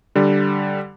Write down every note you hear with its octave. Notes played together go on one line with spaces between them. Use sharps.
D3 G3